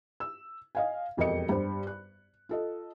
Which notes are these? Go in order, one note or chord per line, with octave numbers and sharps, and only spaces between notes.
E6
D#5 F5 G#5
E1 F2 G4 A#4 D#5 C#7
G2 C5
F#6
F4 A4 D#5